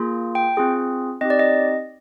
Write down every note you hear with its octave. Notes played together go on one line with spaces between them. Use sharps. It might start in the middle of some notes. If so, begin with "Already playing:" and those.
Already playing: A#3 F4 G#4
G5
C4 F4 G#4
C4 D#4 G4 D#5
D5
D#5